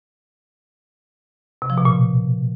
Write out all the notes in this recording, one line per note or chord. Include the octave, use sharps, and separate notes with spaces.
C3
F3
B2
A#2